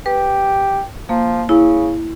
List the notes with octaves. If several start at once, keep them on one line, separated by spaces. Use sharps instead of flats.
G4 B4
F3 A#3
C#3 E4